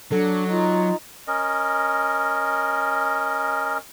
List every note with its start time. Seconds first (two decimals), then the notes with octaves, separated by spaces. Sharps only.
0.12 F#3 D4 A4
0.50 D#4 F4
1.28 C#4 A#4 D#5